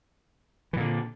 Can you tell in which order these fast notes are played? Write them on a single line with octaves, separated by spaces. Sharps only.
E3 A#2 D3